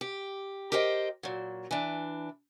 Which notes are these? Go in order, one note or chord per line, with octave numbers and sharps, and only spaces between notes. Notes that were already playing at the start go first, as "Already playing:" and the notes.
G4
G4 A#4 C5 D#5 G5
A#2 F#3
E3 D4